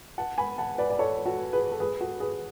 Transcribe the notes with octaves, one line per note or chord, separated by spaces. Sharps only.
F#5 A5
G#5 B5
F#5 A5
B4 D5
D5
A4 C#5
F#4 A4
G#4 B4
A4
G#4 B4
F#4 A4
G#4 B4